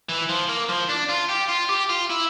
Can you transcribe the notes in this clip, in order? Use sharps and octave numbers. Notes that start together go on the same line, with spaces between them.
E3
F3
A#3
F3
D4
F4
G4
F4
G4
F4
E4